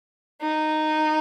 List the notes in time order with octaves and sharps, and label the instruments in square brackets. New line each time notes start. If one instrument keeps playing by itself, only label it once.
[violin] D#4